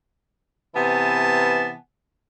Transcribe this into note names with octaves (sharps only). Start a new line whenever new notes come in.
C3 E3 B3 G#5 A5